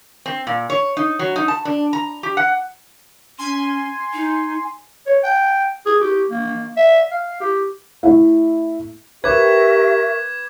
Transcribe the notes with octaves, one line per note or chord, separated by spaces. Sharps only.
C4
A#2
C#5
D#4
F#3
D#4
A5
D4
A#5
G4
F#5
C#4 G#5 C6
D#4
C#5
G5
G#4
G4
A#3
E5
F5
G4
A3 E4
G4 A#4 B4 E5 C#6 D6 G#6